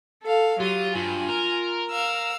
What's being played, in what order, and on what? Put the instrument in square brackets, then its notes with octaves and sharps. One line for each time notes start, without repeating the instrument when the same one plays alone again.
[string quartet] A4 F5
[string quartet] F#3 D#6 [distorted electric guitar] F4 [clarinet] G4
[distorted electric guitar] G2 [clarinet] F4 [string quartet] G#5
[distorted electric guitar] A#4
[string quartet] F5 E6